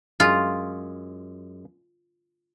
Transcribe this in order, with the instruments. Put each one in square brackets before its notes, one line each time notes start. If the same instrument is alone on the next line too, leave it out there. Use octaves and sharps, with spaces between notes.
[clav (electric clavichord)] F#2 G#3 G#4 [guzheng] F4